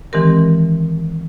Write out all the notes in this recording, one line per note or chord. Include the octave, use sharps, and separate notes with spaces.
D#3 E3 G#3 C4 G4 A#4